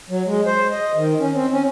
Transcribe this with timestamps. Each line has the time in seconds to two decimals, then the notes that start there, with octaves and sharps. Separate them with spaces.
0.10 F#3
0.26 G#3
0.46 C5
0.71 D#5
0.95 D#3
1.20 C#4
1.34 C4
1.51 C#4